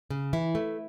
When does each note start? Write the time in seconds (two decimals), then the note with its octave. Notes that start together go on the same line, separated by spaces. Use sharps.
0.10 C#3
0.33 E3 E4
0.55 A3